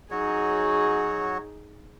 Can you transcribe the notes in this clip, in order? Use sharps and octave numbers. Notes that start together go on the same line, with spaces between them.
F#3 D#4 F#4 G#4 C#5